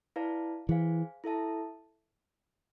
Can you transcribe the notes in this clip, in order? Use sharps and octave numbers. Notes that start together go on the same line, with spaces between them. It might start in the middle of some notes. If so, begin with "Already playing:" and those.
E4 B4 D5 F5 A5
E3 G#4 C5 F5 G#5
E4 A4 E5 A5